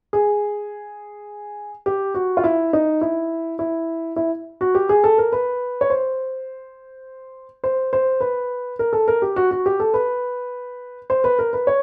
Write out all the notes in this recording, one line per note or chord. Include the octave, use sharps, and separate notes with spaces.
G#4
G4
F#4
F4
E4
D#4
E4
E4
E4
F#4
G4
G#4
A4
A#4
B4
C#5
C5
C5
C5
B4
A#4
A4
A#4
G4
F#4
F#4
G4
A4
B4
C5
B4
A#4
B4
C#5